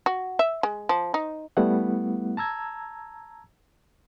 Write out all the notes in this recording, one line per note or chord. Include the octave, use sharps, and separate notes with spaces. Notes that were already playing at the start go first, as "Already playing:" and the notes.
F#4
E5
G#3
F3
D#4
G3 A3 B3 E4 F#5
A5 A#5 E6 G#6